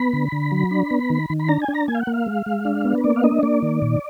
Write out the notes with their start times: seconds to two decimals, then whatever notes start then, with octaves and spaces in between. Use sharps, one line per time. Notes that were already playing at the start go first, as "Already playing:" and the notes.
Already playing: B3 B5
0.13 D3
0.32 D3
0.52 F#3
0.71 D4
0.91 B3
1.10 D#3
1.30 D#3
1.40 B5
1.49 D4 A#5
1.62 G#5
1.68 D4
1.74 A#5
1.88 A#3 G#5
1.95 F5
2.00 F#5
2.07 A#3
2.13 F5
2.26 G#3
2.46 G#3
2.65 D4
2.85 B3
2.98 B4
3.04 A#3 D5
3.16 F5
3.24 D4 D#5
3.43 A#3 D5
3.62 D#3
3.82 A#2